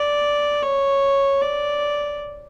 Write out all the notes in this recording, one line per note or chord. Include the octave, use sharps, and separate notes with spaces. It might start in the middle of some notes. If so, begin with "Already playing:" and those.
Already playing: D5
C#5
D5